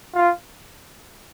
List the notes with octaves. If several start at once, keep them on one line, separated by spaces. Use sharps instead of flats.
F4